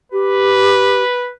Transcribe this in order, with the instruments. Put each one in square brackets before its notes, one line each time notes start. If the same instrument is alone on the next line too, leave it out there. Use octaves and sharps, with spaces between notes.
[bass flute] G4 [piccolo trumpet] B4